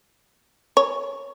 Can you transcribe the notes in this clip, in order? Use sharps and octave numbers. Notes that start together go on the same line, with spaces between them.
C#5